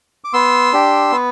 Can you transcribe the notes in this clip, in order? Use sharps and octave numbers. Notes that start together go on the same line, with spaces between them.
D6
B3 C6 E6
D4 G4
B3